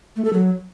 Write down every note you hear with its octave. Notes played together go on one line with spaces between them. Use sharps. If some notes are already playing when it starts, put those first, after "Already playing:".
A3
A4
F#3